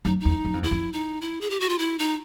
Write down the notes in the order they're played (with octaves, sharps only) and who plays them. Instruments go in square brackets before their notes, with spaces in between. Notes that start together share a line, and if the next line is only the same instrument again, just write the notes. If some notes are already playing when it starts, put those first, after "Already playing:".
[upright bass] F#2 [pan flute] D#4
[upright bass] E2 [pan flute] D#4
[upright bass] F#2
F2
[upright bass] E2 [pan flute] E4
[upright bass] F2
[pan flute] D#4
E4
G#4
G4
F#4
F4
E4
D#4